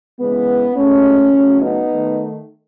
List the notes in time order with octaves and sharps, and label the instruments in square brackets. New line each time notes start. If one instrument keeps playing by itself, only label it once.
[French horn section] C#3 E3 G#3 B3
B2 G#3 A3 C#4
C#3 F#3 A3
B3 D#4
D#3 A3